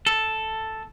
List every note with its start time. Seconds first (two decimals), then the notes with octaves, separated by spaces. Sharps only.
0.06 A4